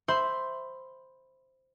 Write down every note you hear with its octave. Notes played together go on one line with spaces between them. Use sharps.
C5 E5 B5 C6